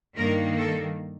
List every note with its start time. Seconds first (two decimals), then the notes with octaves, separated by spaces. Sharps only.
0.17 G2 D#3 A#3 A#4
0.58 A4